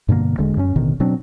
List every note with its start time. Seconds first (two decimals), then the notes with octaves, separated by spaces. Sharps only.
0.09 G2 B2 D3 A#3
0.38 E1 D3 G#3
0.57 F#2 C#4
0.76 A1 B2 D3 D#3
1.00 B2 F#3 C4 D4